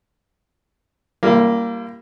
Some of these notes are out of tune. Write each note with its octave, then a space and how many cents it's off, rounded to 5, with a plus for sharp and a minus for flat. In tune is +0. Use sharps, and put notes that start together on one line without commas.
G3 +0 A#3 +0 E4 +45